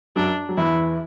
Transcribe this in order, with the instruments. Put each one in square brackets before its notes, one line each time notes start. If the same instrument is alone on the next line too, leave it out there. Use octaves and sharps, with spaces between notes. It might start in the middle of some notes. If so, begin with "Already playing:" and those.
[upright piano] F#2 F#3 [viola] D4
[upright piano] F#3
[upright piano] E2 E3 [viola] E4